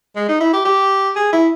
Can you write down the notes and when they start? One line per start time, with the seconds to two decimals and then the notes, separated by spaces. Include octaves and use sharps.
0.16 G#3
0.29 D#4
0.40 E4
0.53 G4
0.65 G4
1.16 G#4
1.32 E4